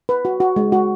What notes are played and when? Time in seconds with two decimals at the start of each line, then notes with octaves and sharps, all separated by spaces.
0.09 B4
0.25 F#4
0.40 F#4
0.56 G#3
0.72 F#4